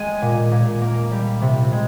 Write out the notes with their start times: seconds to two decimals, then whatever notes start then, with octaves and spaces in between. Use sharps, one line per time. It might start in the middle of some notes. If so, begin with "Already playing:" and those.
Already playing: G#3 G#5
0.22 A#2
0.52 A#2
0.81 A#3
1.12 G3
1.42 C3
1.72 G#3